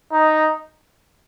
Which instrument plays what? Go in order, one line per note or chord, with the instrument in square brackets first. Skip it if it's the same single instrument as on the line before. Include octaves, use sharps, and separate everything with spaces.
[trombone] D#4